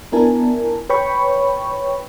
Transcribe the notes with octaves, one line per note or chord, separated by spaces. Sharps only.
B3 D4 E4 A#4 G#5 A5
B4 C#5 G5 B5 C#6